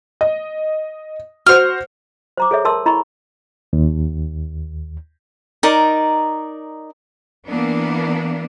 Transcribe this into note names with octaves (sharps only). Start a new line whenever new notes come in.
D#5
F#4 C5 F6
C5 A#5 D6
G#4 A4 C#5 E5
A4 A#4 A5 C6 E6
E4 A#5 B5 C#6
D#2
D#4 A#4 D5
E3 A#3 B3 D4